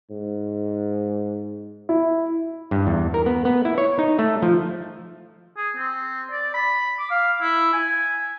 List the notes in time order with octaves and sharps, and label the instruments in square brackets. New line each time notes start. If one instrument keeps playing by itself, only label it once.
[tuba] G#2
[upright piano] E4
[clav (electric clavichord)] G2
E2
A#4
B3
B3
E4
C#5
D#4
A3
F3
[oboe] G#4
C4
D5
B5
D6
F5
E4
G#5